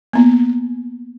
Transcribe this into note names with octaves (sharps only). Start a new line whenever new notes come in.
A#3 B3